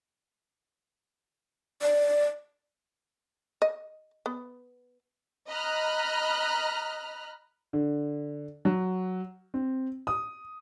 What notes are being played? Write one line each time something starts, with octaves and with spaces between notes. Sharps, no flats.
D5
D#5
B3
D#5 A#5 B5 F6 F#6
D3
F#3
C4
D#6